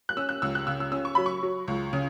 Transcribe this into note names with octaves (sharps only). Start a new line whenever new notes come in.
F#6
C#4 E6
F#6
C#2 E6
F#6
C#3 E6
E6
C#4 E6
C#6
F#3 B5
C#6
F#3
C#2
C#3